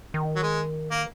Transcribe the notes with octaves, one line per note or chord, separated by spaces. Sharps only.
D#3
F#3
G#3
A#3